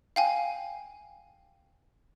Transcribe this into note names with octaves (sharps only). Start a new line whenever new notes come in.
F5 G5 G#5